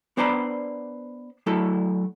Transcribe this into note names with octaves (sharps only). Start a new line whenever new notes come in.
B3 D4 C5 D5 A#5 B5
F#3 A3 E4 A4